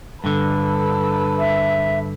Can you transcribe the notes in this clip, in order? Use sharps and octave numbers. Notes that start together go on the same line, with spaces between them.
G2 D3 A4 B4
E5